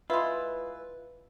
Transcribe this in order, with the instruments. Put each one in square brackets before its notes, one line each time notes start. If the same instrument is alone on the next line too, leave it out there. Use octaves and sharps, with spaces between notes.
[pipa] G#3 E4 [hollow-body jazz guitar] F4 [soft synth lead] B4